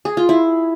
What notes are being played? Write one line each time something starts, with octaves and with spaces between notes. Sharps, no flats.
G#4
F4
E4